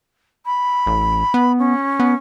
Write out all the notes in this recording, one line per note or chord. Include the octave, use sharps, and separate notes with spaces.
B5
A1
B3
C#4
B3